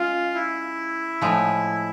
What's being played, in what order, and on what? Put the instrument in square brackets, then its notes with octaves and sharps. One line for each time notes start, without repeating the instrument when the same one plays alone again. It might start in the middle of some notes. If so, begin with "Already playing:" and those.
Already playing: [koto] G#3 C#4 [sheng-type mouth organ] F4
[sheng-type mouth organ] E4
[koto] A2 F3 G#3